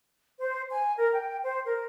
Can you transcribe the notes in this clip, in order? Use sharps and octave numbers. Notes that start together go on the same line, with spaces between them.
C5
G#5
A#4
G5
C5
A#4